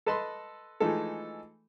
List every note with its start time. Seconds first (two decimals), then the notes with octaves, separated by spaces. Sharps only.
0.06 A4 B4 D#5 A5 B5 C6
0.80 E3 F3 G#3 A3 D#4 A4